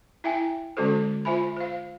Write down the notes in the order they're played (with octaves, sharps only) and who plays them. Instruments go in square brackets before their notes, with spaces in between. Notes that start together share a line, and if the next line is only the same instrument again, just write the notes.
[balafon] E4 E5 G5 G#5
D3 G#3 C#4 F#4 A4 C5
F4 C5 E5 G#5 B5
C5 F5